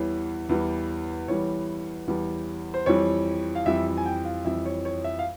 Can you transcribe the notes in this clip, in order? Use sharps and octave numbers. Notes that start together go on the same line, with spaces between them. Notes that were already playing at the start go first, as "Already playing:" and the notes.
Already playing: E2 E3 G3 C#5
E2 E3 G3
E2 E3 G3 C#5
E2 E3 G3
C5
F2 E3 G3 C#5
F5
F2 E3 G3 E5
G#5
G5
F5
F2 E3 G3 E5
C#5
C#5
E5
F5